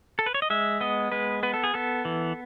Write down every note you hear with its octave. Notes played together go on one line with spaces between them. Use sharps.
A4
B4
C#5
D#5
G#3 E5
B3 D#5
G#3 B4
B3 B4
A4
G#4
B3 A4
E3